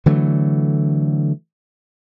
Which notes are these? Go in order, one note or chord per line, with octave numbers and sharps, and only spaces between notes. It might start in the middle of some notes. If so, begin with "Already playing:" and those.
D3 E3 F#3 A3